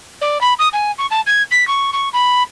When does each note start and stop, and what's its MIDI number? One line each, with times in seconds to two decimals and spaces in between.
0.21 0.41 74
0.41 0.53 83
0.59 0.68 87
0.73 0.91 80
0.98 1.06 85
1.11 1.21 81
1.26 1.42 92
1.51 1.67 95
1.67 1.91 85
1.93 2.09 85
2.13 2.43 83